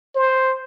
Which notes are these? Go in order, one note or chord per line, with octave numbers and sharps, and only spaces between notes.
C5